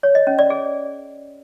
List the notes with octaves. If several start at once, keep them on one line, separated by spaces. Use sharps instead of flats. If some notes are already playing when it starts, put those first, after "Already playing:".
C#5
D#5
C#4
D5
G#4